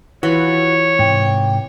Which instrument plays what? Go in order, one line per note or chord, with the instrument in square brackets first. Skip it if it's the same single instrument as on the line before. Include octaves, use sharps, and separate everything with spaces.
[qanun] E3 B5 [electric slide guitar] F4 F#4 [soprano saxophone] C#5
[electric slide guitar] G#2 C3 [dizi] G5